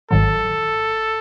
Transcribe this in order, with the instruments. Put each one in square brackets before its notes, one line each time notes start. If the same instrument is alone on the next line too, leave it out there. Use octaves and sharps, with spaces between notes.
[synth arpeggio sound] G#1 G#2 D#3 F#3 [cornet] A4